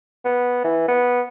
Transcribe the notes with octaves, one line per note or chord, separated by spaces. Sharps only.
B3
E3
B3